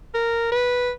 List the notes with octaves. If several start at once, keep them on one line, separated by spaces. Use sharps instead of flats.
A#4
B4